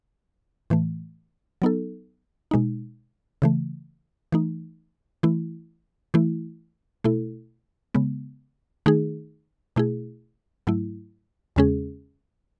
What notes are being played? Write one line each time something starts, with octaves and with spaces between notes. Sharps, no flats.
A2 E3 A3
F#3 B3 D#4 A4
B2 G#3 D#4
C#3 E3 A3
E3 A3 D#4
E3 A3 E4
E3 A3 E4
B2 A3 E4 A4
C#3 G#3 B3
D#3 A3 D#4 G#4
B2 A3 E4 G#4
G#2 F#3 A3 E4
E2 C#3 G#3 C#4 G#4